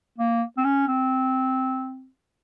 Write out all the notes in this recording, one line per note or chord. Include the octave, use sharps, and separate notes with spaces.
A#3
C4
C#4
C4